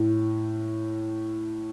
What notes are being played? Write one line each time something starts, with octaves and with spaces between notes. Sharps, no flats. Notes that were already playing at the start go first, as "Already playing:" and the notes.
Already playing: A2